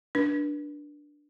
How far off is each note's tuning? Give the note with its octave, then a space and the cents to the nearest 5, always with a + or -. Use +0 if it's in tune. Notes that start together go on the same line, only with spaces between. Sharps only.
D4 +0 B4 -35